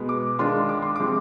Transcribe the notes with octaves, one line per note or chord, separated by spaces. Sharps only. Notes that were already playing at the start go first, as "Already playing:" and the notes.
Already playing: B2 G#3 B3
D6
D#3 G#3 D4 F4 C6
D6
C6
C3 F3 G#3 D6